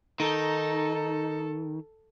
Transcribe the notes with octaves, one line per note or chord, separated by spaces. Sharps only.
D#3 D#4 A4